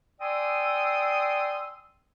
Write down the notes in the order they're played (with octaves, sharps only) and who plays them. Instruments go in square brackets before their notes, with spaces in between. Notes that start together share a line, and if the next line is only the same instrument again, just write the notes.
[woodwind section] D5 G5 G#5 C6 D#6 E6